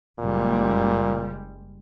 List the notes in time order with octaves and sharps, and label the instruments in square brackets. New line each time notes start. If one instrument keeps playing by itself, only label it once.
[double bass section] F#1 G3 G#3 [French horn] A#2